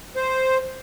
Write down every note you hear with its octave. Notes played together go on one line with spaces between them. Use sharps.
C5